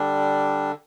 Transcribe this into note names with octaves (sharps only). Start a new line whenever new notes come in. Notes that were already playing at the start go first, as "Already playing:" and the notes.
Already playing: D3 G3 D4